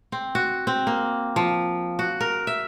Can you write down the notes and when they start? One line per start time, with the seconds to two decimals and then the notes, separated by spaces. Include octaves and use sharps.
0.12 C4
0.35 F#4
0.67 C4
0.87 A#3
1.36 F3
1.99 F#4
2.21 A#4
2.47 E5